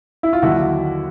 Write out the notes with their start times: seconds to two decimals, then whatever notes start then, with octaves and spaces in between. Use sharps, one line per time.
0.23 E4
0.33 F4
0.42 D#2 D3 F#3 E4 F#4